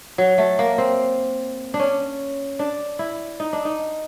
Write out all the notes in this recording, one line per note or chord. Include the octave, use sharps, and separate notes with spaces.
F#3
A3
A#3
C4
D4
C#4
D4
E4
D#4
D4
D#4